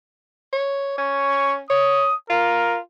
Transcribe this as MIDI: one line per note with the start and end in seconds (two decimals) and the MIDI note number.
0.53 0.96 73
0.98 1.61 61
0.98 1.55 85
1.70 2.09 73
1.70 2.15 87
2.30 2.79 65
2.30 2.78 70